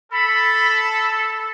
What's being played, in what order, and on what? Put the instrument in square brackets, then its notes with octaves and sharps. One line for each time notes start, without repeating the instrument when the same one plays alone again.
[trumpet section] A4 [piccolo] B5